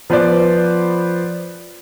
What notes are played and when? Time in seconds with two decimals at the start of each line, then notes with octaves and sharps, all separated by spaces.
0.10 F3 B3 B4 C5 D5